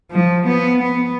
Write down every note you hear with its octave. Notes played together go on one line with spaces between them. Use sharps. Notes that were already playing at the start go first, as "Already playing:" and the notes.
F3
B3
B3